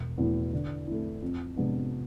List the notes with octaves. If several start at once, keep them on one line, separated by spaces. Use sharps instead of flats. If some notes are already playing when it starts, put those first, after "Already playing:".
Already playing: E1
E2 B2 A3 E4
D3
A3 E4
F2
C3 G#3 B3 D4